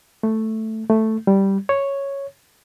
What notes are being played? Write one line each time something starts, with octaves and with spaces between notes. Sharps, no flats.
A3
A3
G3
C#5